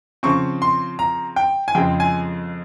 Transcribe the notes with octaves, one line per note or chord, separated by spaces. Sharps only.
C#3 F3 C4 C#6
C6
A#5
G5
G#5
F2 C#3 G#3 C4 G5
G#5